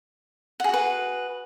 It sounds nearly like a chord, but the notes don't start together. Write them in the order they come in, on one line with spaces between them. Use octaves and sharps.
F#5 G#4 F#4 B4